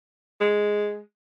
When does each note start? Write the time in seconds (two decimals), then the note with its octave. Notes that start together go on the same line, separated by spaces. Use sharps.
0.40 G#3